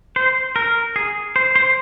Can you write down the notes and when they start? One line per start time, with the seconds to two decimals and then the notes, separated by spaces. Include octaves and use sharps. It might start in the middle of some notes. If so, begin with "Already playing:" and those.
0.16 C5
0.56 A#4
0.96 G#4
1.36 C5
1.56 C5